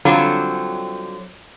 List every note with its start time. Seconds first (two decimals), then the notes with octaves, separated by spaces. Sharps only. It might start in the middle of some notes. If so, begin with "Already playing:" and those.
0.05 D3 F#3 G3 C4 F4 C#5